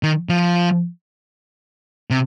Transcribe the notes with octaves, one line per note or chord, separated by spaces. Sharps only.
D#3
F3
C3